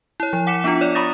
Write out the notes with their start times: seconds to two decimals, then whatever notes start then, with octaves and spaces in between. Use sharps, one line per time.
0.20 E4 C#5
0.33 F3
0.47 F#5 D6 B6 C#7 E7
0.64 B3 D4 F4
0.81 C#5 D5
0.95 A#5 B5 C#6 D#6 A6 A#6